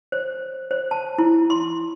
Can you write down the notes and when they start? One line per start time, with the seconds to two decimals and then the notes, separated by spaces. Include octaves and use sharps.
0.12 C5
0.71 C5
0.91 A5
1.18 E4
1.50 C6